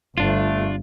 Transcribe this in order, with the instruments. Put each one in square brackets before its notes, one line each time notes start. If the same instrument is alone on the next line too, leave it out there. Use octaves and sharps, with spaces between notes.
[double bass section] G1 [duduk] A3 [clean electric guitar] D4 F4